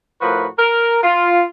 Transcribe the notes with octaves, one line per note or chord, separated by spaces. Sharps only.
A2 F3 F#4 A#4 B4
A#4
F4